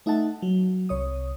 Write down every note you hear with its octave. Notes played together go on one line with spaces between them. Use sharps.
A3 D#4 E5 F#5 A5
F#3
C2 C#5 D#6